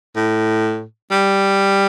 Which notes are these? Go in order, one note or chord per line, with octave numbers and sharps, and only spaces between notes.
A2
G3